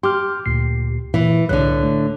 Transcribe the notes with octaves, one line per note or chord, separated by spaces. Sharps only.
G4 C6 D6 F6
D2 A#2 C7
A#2 E3
C2 A2 D3 F#6
A3